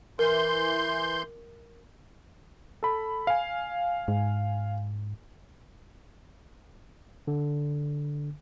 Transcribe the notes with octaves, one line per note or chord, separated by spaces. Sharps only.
E3 A#4 C6 G6
A4 B5
F5 G#5
G#2
D3